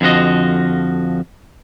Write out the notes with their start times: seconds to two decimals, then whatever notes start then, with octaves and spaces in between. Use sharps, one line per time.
0.01 F2 D3 F3 F#4 D#5